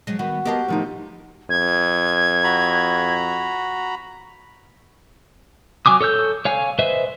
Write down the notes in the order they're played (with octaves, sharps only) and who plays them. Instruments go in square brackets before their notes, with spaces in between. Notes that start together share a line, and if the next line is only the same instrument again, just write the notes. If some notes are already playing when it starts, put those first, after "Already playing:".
[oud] F3 F#3 G#3
[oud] D#3 B3 [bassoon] F#4
[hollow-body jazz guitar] B3 D#5 A5 [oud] G4 A#4 C5
[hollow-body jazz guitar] A2 F3 D#4
[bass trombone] F2 [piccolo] G#6
[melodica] F#4 A#5 B5
[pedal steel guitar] F#3 G#5 D6 D#6
A4 C#5 E6 G6
C#5 F5 G#5
B4 C5 D#5 E5